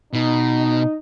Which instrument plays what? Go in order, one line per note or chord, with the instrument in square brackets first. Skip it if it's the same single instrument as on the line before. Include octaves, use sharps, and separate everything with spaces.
[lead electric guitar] B2 [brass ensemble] D#4